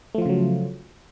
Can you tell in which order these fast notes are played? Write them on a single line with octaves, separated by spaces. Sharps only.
A3 F3 F4 C#3 F#3